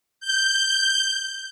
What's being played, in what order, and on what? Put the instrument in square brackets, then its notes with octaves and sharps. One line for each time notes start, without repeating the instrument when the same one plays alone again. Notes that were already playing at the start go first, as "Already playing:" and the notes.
[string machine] G6